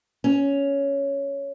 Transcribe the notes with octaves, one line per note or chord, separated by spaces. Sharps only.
C#4